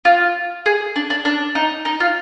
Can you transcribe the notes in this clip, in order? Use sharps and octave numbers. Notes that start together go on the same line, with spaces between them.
F4
G#4
D4
D4
D4
D#4
D#4
F4